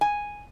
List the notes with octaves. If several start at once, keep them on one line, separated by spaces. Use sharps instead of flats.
G#5